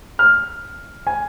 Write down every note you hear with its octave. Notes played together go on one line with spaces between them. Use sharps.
F6
G#5